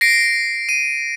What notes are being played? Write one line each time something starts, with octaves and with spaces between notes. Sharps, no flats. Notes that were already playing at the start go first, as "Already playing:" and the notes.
A#6 C7 D7
D#7